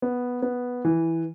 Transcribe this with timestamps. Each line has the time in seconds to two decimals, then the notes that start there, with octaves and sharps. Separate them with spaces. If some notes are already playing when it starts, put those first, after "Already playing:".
0.02 B3
0.42 B3
0.85 E3